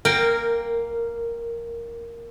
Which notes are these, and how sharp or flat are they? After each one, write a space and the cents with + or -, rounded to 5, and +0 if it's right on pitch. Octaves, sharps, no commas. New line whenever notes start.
A#3 +0 A#4 -15 G5 +15